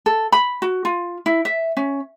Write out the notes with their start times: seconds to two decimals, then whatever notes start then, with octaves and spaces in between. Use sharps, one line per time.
0.06 A4
0.32 B5
0.62 F#4
0.85 F4
1.26 E4
1.45 E5
1.77 C#4